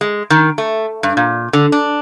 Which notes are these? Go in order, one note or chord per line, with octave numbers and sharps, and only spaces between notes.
G#3
D#3
A3
G2
A#2
D3
D4